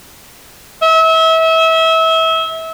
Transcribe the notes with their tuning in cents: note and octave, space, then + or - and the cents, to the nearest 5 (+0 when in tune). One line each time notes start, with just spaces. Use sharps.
E5 -30